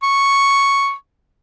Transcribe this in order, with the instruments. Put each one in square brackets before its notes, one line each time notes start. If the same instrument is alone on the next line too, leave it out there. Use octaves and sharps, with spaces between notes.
[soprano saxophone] C#6